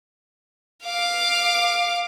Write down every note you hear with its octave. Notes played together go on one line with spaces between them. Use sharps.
F5 D6